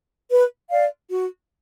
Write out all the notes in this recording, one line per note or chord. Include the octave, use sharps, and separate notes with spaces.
B4
D5 F5
F#4